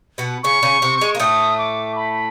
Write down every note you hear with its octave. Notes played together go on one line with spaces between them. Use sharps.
B2 B3
C#3 C#4 C#6
C#3 C#4
C3 C4
G#3
A#3
A2 A3 D#6
D6
B5